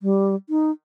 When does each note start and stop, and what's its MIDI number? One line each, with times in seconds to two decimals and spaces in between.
0.02 0.35 55
0.49 0.71 63